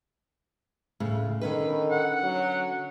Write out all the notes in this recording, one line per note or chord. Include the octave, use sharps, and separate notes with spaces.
D2 A2 C#3
D3 D#3 C#4 B4
F#5
F#3